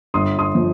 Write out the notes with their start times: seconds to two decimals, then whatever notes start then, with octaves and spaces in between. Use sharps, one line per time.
0.14 G1 C6 D#6
0.39 C6 D#6
0.55 F3